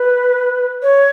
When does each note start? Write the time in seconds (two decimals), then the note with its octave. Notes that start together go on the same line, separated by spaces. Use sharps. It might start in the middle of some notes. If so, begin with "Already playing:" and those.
Already playing: B4
0.82 C#5